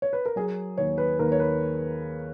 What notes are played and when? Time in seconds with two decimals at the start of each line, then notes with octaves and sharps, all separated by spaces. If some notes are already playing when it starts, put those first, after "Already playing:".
0.02 C#5
0.13 B4
0.25 A#4
0.36 F#3 G#4
0.78 D#2 C#5
0.98 B4
1.19 D#2 A#4
1.32 C#5
1.40 B4